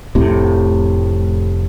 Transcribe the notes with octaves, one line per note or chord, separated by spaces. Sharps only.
F1 A2 C3